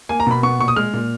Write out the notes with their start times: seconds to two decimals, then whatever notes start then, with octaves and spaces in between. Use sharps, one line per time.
0.09 A#3 G#5
0.20 A#5
0.27 B2 B5
0.43 B3 C#6
0.59 A#2 C#6
0.68 D#6
0.76 G#3 F6
0.93 A#2